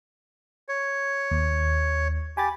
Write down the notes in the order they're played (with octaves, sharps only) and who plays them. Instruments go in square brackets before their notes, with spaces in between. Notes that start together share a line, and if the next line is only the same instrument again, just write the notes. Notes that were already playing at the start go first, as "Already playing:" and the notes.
[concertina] C#5
[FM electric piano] D#2
[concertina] G4 [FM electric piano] G#5 B5 A6